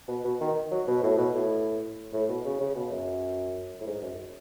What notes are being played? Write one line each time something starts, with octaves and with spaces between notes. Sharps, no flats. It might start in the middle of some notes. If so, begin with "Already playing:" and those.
B2
B2
D#3
F#3
B2
A2
B2
A2
A2
B2
C#3
C#3
B2
F#2
A2
G#2
F#2